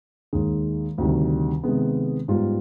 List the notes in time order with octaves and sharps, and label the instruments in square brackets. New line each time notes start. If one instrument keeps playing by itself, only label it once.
[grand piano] D#2 D#3 G#3
D2 C3 D#3 G3
C3 D#3 G#3 B3
G#2 G3 B3 F4